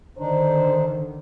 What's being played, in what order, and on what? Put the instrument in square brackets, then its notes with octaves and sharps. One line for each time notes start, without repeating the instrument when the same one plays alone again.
[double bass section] D3 D#3 [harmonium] D4 D#4 [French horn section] C5